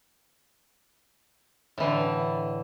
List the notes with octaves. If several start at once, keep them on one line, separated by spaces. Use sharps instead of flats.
A2 D3 E3